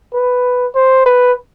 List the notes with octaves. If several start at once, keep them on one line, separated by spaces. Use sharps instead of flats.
B4
C5
B4